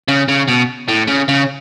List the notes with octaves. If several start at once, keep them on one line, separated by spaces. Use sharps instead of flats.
C#3
C#3
B2
A2
C#3
C#3